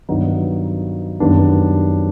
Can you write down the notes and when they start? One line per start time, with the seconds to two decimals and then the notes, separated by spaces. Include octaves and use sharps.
0.09 G2 D#3 F#3 B3 D#4
1.20 F#2 D#3 G3 B3 D4